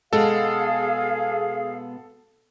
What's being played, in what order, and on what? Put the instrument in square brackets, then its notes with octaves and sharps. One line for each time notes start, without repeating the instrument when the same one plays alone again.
[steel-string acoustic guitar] B2 G#3 B3 [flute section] G#4 F5 [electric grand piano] A4